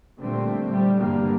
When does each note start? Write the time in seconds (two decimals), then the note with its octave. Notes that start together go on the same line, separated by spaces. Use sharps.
0.21 A#2 D3 G3 A3 C4
0.70 G3
0.99 G2 D3 G3 A#3